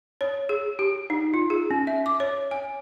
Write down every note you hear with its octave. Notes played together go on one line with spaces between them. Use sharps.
C#5
G#4
G4
D#4
F4
G#4
C#4
E5
D6
C#5
G#5